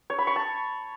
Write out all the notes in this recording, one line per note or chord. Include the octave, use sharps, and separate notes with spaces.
C#5
B5
C#6
A5